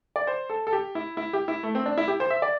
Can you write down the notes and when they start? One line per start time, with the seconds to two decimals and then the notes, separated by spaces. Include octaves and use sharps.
0.16 D5
0.27 C5
0.50 A4
0.67 A4
0.73 G4
0.95 E4
1.17 E4
1.33 G4
1.48 E4
1.63 A3
1.75 C4
1.86 D4
1.98 E4
2.08 G4
2.20 C5
2.30 E5
2.42 D5